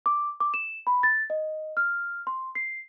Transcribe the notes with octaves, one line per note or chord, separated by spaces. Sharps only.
D6
D6
E7
B5
A6
D#5
F6
C6
C7